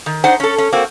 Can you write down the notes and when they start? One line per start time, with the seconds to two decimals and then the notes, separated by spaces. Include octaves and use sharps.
0.06 D#3
0.24 D4 D#4 C5 F#5
0.40 C#4 A4
0.58 C#4
0.73 A#3 C4 F#4